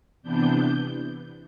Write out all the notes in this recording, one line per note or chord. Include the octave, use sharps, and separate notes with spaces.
C3 E3 B3 D4 G6